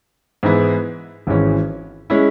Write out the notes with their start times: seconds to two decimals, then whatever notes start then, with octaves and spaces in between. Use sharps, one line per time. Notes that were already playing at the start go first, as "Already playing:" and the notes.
0.43 G#2 E3 B3 E4
1.27 G#1 G#2 E3 C#4
2.10 G#3 C#4 E4